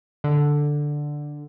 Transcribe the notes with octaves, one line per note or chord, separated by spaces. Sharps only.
D3